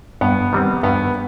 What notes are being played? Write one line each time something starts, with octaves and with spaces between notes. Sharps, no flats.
G2 B3
D#3 G3 C4
G2 B3